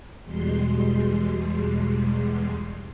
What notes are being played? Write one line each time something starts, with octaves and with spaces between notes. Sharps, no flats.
E2 B2 G3 G#3 C6